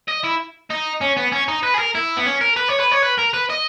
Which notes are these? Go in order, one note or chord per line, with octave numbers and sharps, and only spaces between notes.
D#5
E4
D#4
C#4
B3
C#4
D#4
B4
G#4
A#4
E4
B3
C#4
A#4
B4
C#5
B4
C#5
B4
A#4
B4
D#5